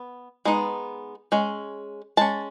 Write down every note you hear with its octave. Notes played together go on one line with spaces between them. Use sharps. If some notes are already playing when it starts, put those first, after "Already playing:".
Already playing: B3
G#3 B3 D#4
G#3 C#4
G#3 C#4 A5